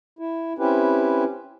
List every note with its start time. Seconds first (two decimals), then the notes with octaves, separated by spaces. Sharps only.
0.19 E4
0.59 C4 C#4 E4 G4 B4